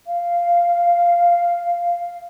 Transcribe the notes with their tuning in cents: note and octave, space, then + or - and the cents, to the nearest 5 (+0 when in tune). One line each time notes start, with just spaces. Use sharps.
F5 -10